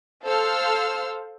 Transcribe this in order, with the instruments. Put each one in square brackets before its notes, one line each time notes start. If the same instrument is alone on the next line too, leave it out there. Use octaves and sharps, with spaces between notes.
[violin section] A4 C5 F5 C6 E6 F6